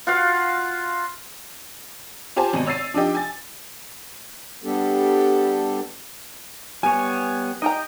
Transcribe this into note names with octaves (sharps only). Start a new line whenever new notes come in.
F4 F#4 F5
F4 G4 C5 G#5 A5
G#1 B2 D#7
C#5 E6 A6 C7 D#7
F3 D4 D#4 G4
G#5 A6
G3 B3 D4 G4 A4
G3 B3 C#5 G#5
D#4 G4 D#5 G5 A#5